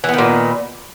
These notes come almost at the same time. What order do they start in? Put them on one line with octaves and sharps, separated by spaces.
E3 B3 D#3 A#2